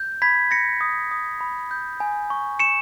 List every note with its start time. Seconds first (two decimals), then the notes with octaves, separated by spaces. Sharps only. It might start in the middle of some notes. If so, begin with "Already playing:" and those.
Already playing: G6
0.22 B5 G#6 B6
0.51 B5 A#6 C#7
0.81 D#6
1.11 D#6
1.41 B5
1.71 G6
2.00 G#5
2.30 C#6
2.59 C#6 C#7 E7